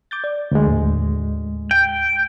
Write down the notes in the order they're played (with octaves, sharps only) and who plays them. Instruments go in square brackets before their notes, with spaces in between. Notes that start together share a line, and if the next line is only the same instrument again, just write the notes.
[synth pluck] D6 G6 A6
D5
[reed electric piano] D2 G#3
[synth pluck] D#2 A2
[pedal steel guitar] G5